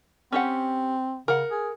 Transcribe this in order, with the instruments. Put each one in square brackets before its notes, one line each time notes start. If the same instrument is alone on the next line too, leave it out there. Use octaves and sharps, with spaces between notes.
[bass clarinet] C4 [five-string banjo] C#4 G4 F#5
[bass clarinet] C#3 [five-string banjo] A#4 F#5
[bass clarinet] G#4